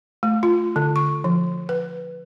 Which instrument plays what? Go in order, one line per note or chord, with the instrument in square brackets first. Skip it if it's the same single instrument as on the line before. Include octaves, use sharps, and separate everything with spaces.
[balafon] A3
F4
D3
C#6
F3
B4